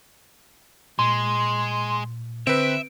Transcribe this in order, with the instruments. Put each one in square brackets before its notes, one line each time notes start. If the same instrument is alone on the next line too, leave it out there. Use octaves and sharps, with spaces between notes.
[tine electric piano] A#2 [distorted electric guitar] G#3 [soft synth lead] C6
[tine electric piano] D3 E6 [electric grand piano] C4 B4 [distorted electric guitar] E5 [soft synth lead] D7